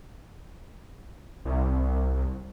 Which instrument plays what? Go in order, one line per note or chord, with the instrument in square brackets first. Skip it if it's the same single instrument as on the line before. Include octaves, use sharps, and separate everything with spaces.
[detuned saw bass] C2